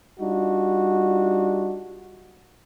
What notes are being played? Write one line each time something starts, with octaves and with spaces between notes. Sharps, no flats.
G3 D4 D#4 F4 F#4